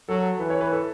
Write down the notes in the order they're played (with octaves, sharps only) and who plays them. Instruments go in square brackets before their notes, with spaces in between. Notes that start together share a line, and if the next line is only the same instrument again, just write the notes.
[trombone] F#3 [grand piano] A4
[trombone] E3 [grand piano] B4
[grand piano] C#5
B4
A4